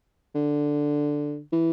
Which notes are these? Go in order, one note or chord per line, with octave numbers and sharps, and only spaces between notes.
D3
E3